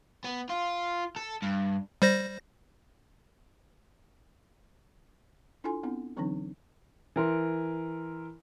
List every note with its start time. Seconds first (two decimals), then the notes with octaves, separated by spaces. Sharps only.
0.24 B3
0.49 F4
1.16 A4
1.42 G2
2.02 G3 C5 A#6
5.64 D4 E4 F4 A4 G#5 C6
5.83 B3 C4 D4 E4
6.17 D3 E3 F#3 C4 D4 D#4
7.16 E3 A#4 C6